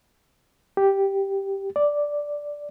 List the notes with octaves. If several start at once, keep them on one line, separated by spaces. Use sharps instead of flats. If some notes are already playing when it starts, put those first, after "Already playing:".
G4
D5